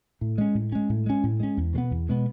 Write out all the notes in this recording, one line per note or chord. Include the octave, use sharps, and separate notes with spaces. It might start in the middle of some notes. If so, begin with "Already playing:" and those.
A2
G#3 C#4
A2
G#3 C#4
A2
G#3 C#4
A2
G#3 C#4
E2
B2 G#3 B3
E2
B2 G#3 B3